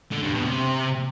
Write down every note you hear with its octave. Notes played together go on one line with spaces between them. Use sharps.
D3
G2
B2
C3